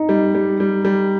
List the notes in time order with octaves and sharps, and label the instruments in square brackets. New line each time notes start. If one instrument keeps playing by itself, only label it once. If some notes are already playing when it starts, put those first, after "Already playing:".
Already playing: [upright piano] D#4
[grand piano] G3
G3
G3
G3